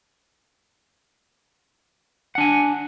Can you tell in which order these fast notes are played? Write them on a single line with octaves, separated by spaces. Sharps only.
F#5 D4 G#5